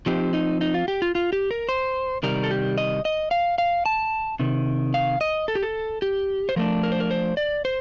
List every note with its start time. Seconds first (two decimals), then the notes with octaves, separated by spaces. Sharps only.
0.06 F3 C4 D#4 G4
0.33 D#4
0.61 D#4
0.74 F4
0.88 G4
1.02 F4
1.15 F4
1.33 G4
1.51 A#4
1.69 C5
2.23 C3 D#3 G3 A#4
2.44 A4
2.51 G4
2.78 D#5
3.05 D#5
3.31 F5
3.58 F5
3.86 A5
4.40 C3 D#3
4.94 F5
5.21 D#5
5.48 A4
5.55 G4
5.63 A4
6.02 G4
6.49 C5
6.56 F3 A3 D4 A#4
6.83 A#4
6.92 C5
7.00 A#4
7.11 C5
7.37 D5
7.65 C5